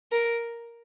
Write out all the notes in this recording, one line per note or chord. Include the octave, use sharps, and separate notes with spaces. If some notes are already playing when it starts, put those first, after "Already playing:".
A#4